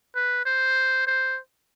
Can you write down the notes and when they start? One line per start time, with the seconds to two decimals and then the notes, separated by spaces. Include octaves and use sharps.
0.15 B4
0.46 C5
1.07 C5